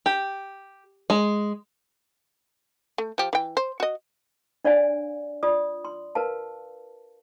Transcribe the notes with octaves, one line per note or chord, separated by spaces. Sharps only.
G4
G#3
A3
F3 G4
E3 G5
C5
F#4 D#5
D4 C#5 D5 F5 G#5
F4 D5 D#6
C6
A#4 B4 F5 A5